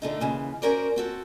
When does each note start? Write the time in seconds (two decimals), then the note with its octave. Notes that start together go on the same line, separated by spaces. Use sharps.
0.02 D3 A3 D#4
0.20 D#2 C#3 E3
0.62 C#4 F#4 A#4 C5 D5
0.96 C4 F#4 A4